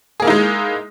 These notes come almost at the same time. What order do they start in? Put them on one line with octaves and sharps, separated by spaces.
G#4 A#3 E4 D#4 G#3